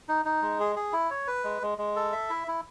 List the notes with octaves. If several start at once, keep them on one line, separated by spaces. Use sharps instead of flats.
D#4
D#4
G#3
G#4
G#4
E4
C#5
B4
G#3
G#3
G#3
A4
E5
E4
E4